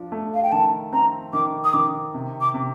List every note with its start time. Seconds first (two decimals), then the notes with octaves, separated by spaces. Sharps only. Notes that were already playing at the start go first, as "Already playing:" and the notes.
Already playing: F3 D4
0.12 A3
0.34 F5
0.43 G5
0.52 D#3 A5
0.93 C4 A#5
1.33 D#3 D6
1.64 D#6
1.73 D#3 D6
2.14 C3
2.41 D6
2.54 C3